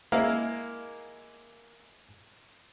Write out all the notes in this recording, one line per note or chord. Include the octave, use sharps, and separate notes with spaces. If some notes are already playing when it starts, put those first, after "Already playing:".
G#3 A#3 E4 A#4 F5